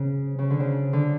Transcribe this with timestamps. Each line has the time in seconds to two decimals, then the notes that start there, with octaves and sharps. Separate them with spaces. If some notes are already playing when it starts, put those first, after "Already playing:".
Already playing: C#3
0.39 C#3
0.50 D3
0.60 C#3
0.93 D3